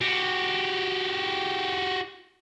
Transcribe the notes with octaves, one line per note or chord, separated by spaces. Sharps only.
F#4 G4